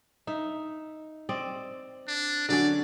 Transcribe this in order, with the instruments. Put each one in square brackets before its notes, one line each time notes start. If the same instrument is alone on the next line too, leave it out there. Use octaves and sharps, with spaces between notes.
[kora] D#4 E5
C4 D5 D#5
[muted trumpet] D4
[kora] D3 F#3 C#4 [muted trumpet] D5